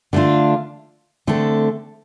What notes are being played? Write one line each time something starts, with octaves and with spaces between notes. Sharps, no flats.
D3 A3 D4 F4
D3 A3 C4 A4